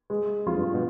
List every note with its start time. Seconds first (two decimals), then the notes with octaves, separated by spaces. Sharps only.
0.10 G#3
0.46 F2 F4
0.56 G2
0.74 B2